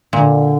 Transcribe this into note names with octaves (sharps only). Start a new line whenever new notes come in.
A#2 D3